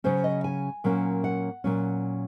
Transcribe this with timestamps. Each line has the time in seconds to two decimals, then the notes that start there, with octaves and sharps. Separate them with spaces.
0.04 C#3 F#3 C#4 C5
0.24 D#5
0.44 G#5
0.84 A#2 F#3 A#3 C#4
1.24 F#5
1.64 A#2 F#3 C#4